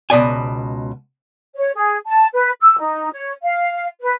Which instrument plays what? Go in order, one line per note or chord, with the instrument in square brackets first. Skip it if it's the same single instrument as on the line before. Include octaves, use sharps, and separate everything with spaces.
[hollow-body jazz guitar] C#2 B2 D5 G#5
[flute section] C#5
G#4
A5
B4
E6
D#4
C#5
F5
B4